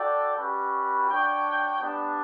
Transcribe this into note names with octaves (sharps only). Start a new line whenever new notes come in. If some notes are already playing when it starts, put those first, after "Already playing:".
Already playing: F#4 A4 D5 G5
G3 C#4 F#4 B4
D4 F#4 C#5 G5
G3 B3 D4